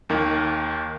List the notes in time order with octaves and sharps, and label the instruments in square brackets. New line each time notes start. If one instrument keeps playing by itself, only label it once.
[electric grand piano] D#2 D#3 A#3